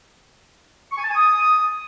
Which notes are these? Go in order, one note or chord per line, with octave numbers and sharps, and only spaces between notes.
C#6
G#5
A5
G#5
D#6